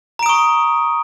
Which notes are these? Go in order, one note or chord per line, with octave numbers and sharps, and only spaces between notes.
A#5 C#6 D#6 D7